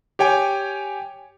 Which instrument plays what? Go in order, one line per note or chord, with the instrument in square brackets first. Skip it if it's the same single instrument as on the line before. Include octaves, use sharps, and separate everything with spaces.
[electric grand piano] G4 C#5 G5 G#5